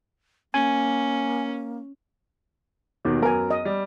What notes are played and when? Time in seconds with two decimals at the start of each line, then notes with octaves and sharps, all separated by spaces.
0.54 A#3 C#4 G#5
3.05 D#2 B2 D#3
3.22 F#2 B3 A#4 G#5
3.51 D#5
3.65 G3